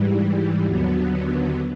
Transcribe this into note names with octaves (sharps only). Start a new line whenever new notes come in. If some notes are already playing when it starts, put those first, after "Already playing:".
Already playing: G#2 E3 G3
D#2 D3 F#3 B3